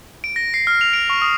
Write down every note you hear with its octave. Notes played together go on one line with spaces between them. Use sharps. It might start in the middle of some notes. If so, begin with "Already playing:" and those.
D7
A#6
C7
F6
F7
D7
C#6
D#6